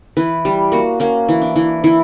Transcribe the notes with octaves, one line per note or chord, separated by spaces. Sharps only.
E3 B4
G3
A#3 F#4
A#3 C#4
E3
D4
E3
E3 E4